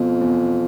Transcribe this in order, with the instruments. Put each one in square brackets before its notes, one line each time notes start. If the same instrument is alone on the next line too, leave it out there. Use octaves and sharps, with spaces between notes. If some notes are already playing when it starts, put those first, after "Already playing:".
Already playing: [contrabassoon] F2 [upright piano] B2
[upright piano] E2